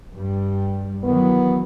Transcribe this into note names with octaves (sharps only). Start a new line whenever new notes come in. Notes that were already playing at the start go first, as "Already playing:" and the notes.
G2 G3
D#3 E3 F#3 B3